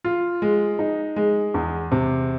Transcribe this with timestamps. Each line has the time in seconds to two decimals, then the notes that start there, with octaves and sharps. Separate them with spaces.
0.04 F4
0.42 G#3
0.79 D#4
1.16 G#3
1.54 E2
1.92 C3